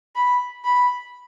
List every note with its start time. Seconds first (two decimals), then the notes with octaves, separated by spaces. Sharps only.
0.15 B5
0.65 B5